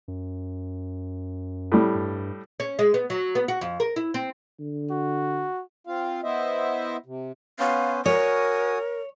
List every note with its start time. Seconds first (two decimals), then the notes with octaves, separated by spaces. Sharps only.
0.08 F#2
1.72 A2 G3
1.95 G2
2.60 C#4
2.79 G#3
2.94 B3
3.10 F#3
3.35 B3
3.48 F#4
3.61 F2
3.80 A#4
3.96 E4
4.14 C4
4.59 D3
4.91 F#4
5.87 C4 F4 F5
6.24 B3 E4 C5 D#5 E5
7.06 C3
7.59 B3 C#4 C5 F5
8.06 F#4 A#4 C#5 G#5 D#6